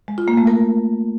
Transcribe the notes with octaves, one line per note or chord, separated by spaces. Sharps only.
G#3
F4
A#3
A3
A#4